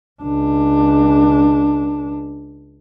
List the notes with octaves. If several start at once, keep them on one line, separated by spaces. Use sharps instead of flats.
C#2 D4